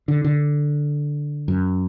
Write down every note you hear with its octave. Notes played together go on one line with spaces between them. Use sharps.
D3
D3
F#2